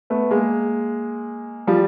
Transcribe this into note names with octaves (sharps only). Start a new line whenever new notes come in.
A3 B3
G#3 A#3
F3 G3